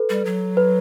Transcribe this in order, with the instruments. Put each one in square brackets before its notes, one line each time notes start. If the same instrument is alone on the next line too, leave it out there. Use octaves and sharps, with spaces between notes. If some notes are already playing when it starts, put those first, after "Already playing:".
Already playing: [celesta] A4 B4
[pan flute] G3
F#3
[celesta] B4